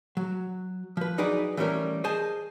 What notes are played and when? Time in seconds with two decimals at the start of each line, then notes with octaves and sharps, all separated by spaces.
0.17 F#3
0.97 F3 B4
1.18 F#3 D#4 F#4 G#4 B4 D5
1.57 E3 G3 A3 C#4 A#4
2.04 G#4 C5 D#5 G#5 A5